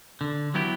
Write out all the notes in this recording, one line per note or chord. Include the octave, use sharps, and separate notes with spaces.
D3
F#3 B3 E4 G4